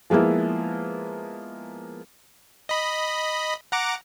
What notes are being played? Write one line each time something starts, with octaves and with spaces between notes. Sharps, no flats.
F3 G#3 A#3 B3 E4
D#5 B5
F#5 A#5 D6